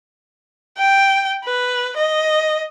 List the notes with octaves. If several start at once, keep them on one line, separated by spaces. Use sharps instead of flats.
G5
B4
D#5